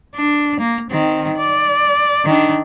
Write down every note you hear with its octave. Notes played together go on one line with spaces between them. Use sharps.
D4
A#3
D#3 C4
D5
D#3 D4